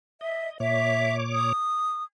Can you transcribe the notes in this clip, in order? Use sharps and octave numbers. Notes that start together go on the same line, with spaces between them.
D#5 E5
A#2 C#5 E5 D6
D#6